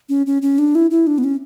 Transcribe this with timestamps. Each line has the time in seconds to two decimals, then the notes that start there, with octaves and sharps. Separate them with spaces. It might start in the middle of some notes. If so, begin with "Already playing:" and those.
0.09 C#4
0.26 C#4
0.42 C#4
0.58 D4
0.75 E4
0.91 E4
1.07 D4
1.18 B3
1.24 C#4